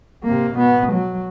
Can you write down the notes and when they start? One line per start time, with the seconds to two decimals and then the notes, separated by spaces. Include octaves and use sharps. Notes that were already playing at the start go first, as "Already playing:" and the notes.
0.23 C3 A#3
0.55 B2 B3
0.93 F#3